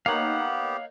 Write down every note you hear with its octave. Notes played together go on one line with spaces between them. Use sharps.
A#3 B3 D#4 G4 C#5 F5 F#5